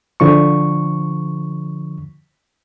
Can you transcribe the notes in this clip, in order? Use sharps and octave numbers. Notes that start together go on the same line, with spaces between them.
D3 F3 C#6